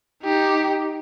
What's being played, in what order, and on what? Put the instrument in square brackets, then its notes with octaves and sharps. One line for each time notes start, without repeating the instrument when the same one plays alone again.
[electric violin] D#4 G4